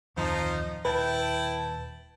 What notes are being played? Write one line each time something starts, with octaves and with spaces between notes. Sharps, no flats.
D1 F2 D#3 F3 D#4
D#1 E4 B4 G5 A5